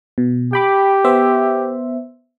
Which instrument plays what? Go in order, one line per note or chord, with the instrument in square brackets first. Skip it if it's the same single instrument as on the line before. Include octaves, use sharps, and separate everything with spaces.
[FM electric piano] B2
[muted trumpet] G4 [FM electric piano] G5 B5 D6
[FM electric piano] B3 C5 E5